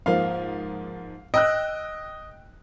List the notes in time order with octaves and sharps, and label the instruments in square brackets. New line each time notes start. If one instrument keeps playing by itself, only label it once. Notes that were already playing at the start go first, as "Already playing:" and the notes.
[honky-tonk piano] G#2 F3 A#3 [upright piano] F5
[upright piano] D#5 [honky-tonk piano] G5 E6 F#6